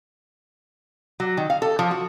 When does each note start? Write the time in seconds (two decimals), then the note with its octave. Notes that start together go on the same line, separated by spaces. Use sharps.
1.20 F#3
1.37 D#3
1.50 F5
1.62 A4
1.79 F3
1.91 F#4